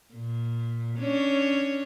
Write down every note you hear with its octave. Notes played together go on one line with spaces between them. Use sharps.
A#2
C#4 D4 C#5